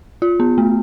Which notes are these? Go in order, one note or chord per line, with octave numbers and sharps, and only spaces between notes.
F4
B3
A3